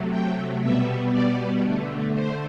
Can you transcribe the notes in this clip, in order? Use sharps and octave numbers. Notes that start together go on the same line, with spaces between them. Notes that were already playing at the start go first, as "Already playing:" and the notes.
Already playing: C3 F#3 A3
G5
B2 G3 B3 E5
D5
D3 A3
C5